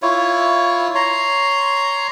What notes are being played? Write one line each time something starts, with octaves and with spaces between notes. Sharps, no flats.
E4 F4 C#5
C#5 A#5 C6